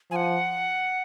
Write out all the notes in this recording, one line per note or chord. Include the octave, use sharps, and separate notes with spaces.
F3 F#5 G#5